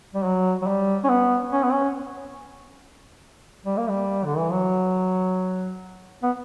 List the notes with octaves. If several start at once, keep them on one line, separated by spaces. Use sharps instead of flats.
G3
F#3
F#3
G3
C#4
B3
C#4
B3
C#4
G3
A#3
G3
D3
E3
F#3
B3